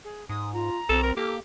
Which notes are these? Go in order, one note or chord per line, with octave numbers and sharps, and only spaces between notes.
G#4
G#2 D#6
F4 A#5
B1 C4 A4
A#4
A#3 G4 A4